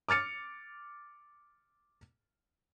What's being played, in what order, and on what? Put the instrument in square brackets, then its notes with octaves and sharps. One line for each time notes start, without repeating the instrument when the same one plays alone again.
[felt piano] D6 F6 A6 C#7